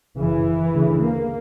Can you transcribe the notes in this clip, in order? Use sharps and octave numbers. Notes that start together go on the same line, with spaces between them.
F#1 F#2 C#3 E3
D2 C#3
A#3